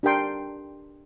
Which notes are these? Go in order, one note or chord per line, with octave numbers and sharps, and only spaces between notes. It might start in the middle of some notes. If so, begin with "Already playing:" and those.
D4 G4 A#4 G5 C6